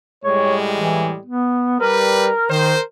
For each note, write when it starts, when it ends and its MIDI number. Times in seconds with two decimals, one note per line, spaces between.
0.24 1.18 45
0.24 1.18 55
0.24 1.18 56
0.24 0.55 73
0.75 1.12 52
1.25 1.79 59
1.80 2.29 55
1.80 2.45 70
1.80 2.29 71
2.50 2.74 51
2.50 2.80 70
2.50 2.80 72